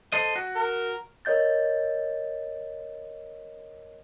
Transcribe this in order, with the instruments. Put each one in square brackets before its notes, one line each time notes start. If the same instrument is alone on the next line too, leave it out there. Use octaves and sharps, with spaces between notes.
[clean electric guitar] A4 C5 D#5
F#4
[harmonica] A#4
[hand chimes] A#4 C#5 D#5 G6 A6